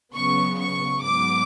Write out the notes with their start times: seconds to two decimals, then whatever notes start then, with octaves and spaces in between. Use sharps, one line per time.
0.13 C#3 F#3 B3 C#6
0.58 C#6
1.01 G#2 F#3 B3 D6